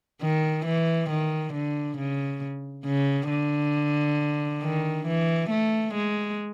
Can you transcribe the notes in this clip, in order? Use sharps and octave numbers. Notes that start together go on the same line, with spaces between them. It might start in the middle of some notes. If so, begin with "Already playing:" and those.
D#3
E3
D#3
D3
C#3
C#3
D3
D#3
E3
A3
G#3